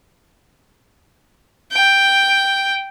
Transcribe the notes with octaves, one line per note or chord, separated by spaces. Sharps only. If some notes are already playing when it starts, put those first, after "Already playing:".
G5